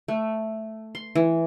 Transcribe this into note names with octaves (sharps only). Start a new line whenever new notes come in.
A3
C6
E3